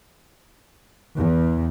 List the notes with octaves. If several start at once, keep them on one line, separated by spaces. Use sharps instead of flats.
E2